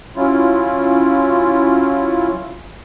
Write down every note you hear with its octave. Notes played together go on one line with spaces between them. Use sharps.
F#3 C#4 E4 F4